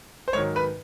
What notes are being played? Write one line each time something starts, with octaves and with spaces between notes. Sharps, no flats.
C5
G#2 D#3 F#3 C#5
B4